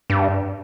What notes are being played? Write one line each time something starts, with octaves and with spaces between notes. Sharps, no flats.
G2